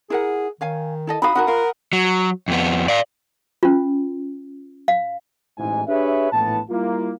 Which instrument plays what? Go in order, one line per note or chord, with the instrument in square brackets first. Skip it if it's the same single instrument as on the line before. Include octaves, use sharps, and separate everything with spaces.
[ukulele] E4 A#4 F#5 [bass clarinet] G#4
[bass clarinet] D#3 [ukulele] C#5 F5 G#5
[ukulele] E4 A4 D#5
[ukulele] D#4 F#4 F5 [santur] B5 D#6
[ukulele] D#4 F#4 A#4 [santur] F#5
[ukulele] F4 F5 [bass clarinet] A#4
[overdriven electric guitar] F#3
F2 B3
D5 F5
[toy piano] C#4 F4
F5
[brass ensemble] A1 G#2 E4 G#5
D4 G4 G#4 B4 C#5 E5
A#1 A2 E3 B3 A5
G3 A#3 E4 F4